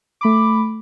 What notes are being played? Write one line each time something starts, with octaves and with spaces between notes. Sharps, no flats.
A3 B5 D6